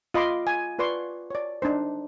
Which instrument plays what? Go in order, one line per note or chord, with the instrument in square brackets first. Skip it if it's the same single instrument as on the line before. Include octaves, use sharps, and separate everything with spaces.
[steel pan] F4 D#5 B5 C6 D6
G#5
F4 B4 D5 C6 C#6
C#5 D5
D4 D#4 C5